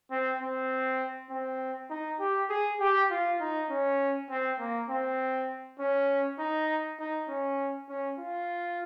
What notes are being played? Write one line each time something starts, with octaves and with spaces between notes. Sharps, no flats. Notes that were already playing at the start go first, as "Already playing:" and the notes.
C4
C4
C4
D#4
G4
G#4
G4
F4
D#4
C#4
C4
A#3
C4
C#4
D#4
D#4
C#4
C#4
F4